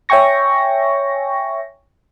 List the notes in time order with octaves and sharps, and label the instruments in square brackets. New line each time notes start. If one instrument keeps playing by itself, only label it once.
[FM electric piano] C#5 E5 G5 G#5 C#6 A#6